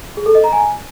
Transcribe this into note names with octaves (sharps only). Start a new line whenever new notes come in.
G#4
A4
D#5
A#5
G#5